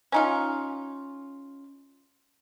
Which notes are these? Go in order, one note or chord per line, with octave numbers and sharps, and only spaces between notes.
C#4 D#4 F4